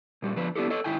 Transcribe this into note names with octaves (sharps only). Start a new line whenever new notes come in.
A#2 G3 F#4
F3 B3 D4 B4
B3 D4 E4 G4 A4
A4 C#5 D#5
G#2 D#3 E4 G5 G#5